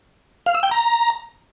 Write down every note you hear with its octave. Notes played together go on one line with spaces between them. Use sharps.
F5
E6
G5
A#5